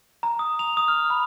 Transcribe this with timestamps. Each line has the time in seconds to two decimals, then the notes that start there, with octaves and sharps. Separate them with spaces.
0.23 A#5
0.39 D#6
0.59 F7
0.77 D#6
0.88 F6
1.10 B5